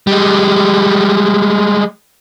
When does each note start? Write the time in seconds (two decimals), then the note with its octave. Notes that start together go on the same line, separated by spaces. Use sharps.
0.07 G3 G#3